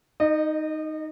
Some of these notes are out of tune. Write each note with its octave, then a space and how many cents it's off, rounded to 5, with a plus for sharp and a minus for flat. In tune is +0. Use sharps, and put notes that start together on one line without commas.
D#4 +0 D#5 -35